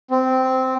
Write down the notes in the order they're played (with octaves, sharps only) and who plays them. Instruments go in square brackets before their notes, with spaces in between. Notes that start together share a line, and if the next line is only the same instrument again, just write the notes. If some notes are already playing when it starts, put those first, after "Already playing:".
[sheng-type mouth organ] C4